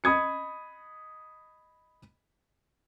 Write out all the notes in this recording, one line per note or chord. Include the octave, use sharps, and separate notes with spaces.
D#5 B5 D#6 G#6 C#7